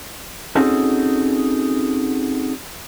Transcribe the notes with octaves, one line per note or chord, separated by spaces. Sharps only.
C4 C#4 D#4 F#4 G#4 A4